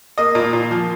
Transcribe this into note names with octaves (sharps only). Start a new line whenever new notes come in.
A#3 D#5
A#2
A#2
F3